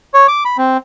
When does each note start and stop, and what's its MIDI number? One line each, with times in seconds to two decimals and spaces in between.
0.14 0.27 73
0.28 0.44 86
0.45 0.57 83
0.58 0.77 60